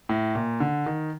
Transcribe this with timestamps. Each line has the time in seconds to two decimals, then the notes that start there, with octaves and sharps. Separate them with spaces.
0.09 A2
0.35 A#2
0.60 D3
0.86 D#3